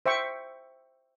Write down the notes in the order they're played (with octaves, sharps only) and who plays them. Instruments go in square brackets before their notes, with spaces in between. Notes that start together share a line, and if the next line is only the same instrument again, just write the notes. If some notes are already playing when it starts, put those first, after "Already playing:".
[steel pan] C5 E5 G5 C#6